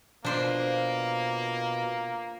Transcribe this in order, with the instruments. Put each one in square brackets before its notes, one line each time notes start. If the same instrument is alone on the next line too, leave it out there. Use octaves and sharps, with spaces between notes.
[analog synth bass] B2 [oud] F3 [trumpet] A#3 [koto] D4 C5 D5